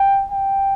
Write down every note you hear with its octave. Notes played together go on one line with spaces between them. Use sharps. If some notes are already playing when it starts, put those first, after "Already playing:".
Already playing: G5
G5